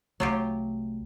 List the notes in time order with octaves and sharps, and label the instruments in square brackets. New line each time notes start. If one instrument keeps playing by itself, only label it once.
[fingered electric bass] C2 C3 A3 [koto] F#3 F4 G4